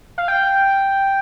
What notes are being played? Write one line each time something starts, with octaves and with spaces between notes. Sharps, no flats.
F5
G5